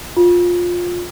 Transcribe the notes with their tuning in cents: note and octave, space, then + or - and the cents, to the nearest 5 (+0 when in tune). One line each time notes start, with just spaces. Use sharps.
F4 +15